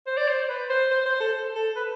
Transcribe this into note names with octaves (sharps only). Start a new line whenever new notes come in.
C5
D5
C5
B4
C5
C5
C5
A4
A4
B4